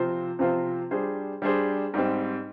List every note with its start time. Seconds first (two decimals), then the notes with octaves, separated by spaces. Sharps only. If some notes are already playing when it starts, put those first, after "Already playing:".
Already playing: C3 F3 C4 F4 C5
0.39 C3 F3 C4 F4 C5
0.91 G3 D4 G#4 C5
1.42 G3 D4 G#4 C5
1.94 G#2 G3 C4